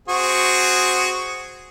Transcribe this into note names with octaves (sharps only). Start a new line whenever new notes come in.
C4 F#4 G#4